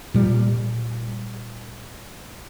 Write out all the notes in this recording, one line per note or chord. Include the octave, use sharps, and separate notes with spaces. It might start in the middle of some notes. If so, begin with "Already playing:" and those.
A#2 G3